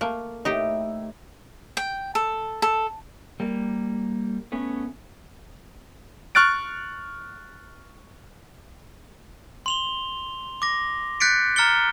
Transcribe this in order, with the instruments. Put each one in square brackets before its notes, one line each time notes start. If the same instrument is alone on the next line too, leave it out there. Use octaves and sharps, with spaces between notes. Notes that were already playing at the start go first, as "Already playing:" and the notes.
[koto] A3 A#3
[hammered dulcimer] A2 [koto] D#4 G4
[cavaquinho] G5
A4
A4
[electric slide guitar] G3 A#3
A3 B3 C#4
[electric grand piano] C#6 F6 F#6 A6 D7
[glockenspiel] C6 F7 G7
D6 A#6
F#6 G6 A6 B6 C#7 D7
A#5 F6 A6 C#7 G7